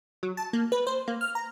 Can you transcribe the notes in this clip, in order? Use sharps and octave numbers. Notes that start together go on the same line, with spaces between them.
F#3
A5
A#3
B4
C5
A#3
F6
A#5